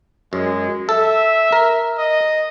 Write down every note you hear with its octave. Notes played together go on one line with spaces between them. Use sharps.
F#2 G#3
A4 E5
A#4
D#5